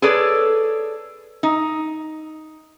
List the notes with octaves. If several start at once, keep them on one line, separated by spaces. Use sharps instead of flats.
G#4 A4 B4 C#5 D5
D#4